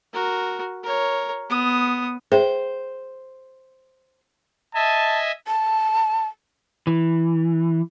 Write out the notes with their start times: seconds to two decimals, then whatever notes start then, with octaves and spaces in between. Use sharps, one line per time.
0.13 F#4 A#4
0.83 A#4 C#5
1.49 B3 D#6
2.32 G#4 C5 E5 G5
4.75 D#5 E5 G#5 A5
5.46 A5
6.87 E3